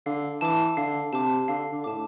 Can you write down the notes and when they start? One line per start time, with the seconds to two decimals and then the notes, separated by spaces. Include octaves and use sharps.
0.06 D3 F5
0.41 E3 A5 D6
0.77 D3 F5
1.13 C3 A5 D6
1.48 D3 F5
1.72 D3
1.84 A2 A5 D6